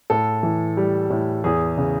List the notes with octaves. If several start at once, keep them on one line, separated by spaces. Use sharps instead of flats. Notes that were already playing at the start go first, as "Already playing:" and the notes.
A2 A4
E3
G3
A2
E2 G#4
C#3